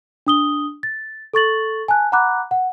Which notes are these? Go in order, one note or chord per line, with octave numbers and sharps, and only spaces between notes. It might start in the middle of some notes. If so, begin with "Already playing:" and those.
D4 D#6 G7
A6
A4 C#6 A6 F#7
G#5 A5 F#6
F#5 A#5 B5 D6 F#6
F#5